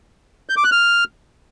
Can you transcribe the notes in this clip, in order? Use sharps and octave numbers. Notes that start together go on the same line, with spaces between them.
G6
D6
F#6
F6